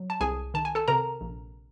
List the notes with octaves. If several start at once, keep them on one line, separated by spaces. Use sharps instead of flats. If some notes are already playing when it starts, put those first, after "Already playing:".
Already playing: F#3
A5
C2 G#4 G#5
D#3 A5
G#5
A4 A5
C3 A#4 A#5
A#1